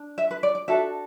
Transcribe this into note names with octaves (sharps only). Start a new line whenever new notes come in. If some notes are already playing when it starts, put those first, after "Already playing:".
Already playing: D4
E5
B4
D5
D5
D4 F#4 A4 E5